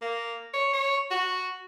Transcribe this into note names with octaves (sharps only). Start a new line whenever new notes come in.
A#3
C#5
C#5
F#4